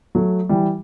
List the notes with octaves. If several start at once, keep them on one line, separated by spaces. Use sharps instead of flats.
F#3 A3
E3 G3